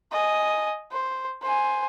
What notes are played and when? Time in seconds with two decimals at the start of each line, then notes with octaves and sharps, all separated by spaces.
0.12 D#5 G#5
0.92 C5
1.42 C5 G#5